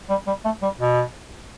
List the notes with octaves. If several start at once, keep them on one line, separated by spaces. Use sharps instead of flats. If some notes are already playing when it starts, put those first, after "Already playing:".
G3
G3
A3
G3
B2